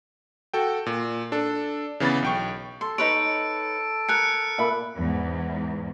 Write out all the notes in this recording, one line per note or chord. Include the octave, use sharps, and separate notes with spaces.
F#4 A4 G5
A#2
D4 A4
C#3 E3 B3 B5 A6
B1 G5 C#6
A4 C6
D#4 B4 C#5 D7
A#4 G#5 F#6 C#7
A#2 E5 B5
E2 G#2